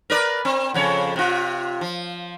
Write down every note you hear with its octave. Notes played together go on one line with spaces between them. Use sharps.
A#4 B4 D5
C4
F2 C#3 C#5
C3 F4
F3